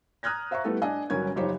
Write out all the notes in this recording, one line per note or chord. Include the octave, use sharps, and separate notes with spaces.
A#5 D#6 F6 F#6 G#6 A#6
C5 E5 F5 A#5 C#6
G3 A3 B3 E4 A4
D4 D#5 G#5
G1 F#3 C#4 A#4 G#6
F#1 F3 D#4 G4 C5 C#5